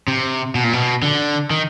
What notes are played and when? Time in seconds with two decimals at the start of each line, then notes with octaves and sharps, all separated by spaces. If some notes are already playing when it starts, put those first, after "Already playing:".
0.08 C3
0.55 B2
0.64 A#2
0.73 B2
1.03 D3
1.50 D#3